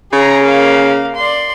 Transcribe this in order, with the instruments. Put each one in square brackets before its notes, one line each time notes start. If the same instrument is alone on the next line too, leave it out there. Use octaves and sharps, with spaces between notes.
[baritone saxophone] C#3 [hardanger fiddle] G#4 A#5
[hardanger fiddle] A#3 F5
D5 C6